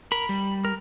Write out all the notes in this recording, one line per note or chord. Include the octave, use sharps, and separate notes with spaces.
A#4 B5
G3
A#4